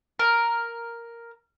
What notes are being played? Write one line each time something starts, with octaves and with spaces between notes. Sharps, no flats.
A#4